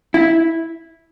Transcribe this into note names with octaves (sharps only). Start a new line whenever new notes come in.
E4